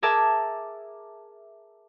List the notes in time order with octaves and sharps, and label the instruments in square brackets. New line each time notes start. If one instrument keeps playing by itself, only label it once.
[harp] G#4 A#4 E5 A5 D6